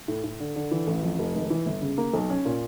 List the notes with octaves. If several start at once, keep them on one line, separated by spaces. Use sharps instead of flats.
A2
A2
D3
D3
E3
A1
F2
F1
G#1
E3
G1
C#3
A#3
B1
C#4
A#2